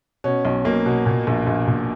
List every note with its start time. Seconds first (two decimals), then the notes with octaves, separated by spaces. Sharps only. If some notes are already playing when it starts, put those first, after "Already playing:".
0.24 B2 C#4
0.45 B1
0.65 B1 A#3
0.86 B2
1.06 A#2
1.27 A#1
1.47 A#1
1.67 A#2